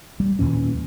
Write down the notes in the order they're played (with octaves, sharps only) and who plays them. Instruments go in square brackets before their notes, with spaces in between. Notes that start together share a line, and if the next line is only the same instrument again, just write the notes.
[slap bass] G3
D#2 A#2 E3 C#4